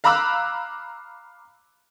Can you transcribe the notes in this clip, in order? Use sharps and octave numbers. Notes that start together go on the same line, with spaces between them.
F5 A#5 B5 D6 E6 F#6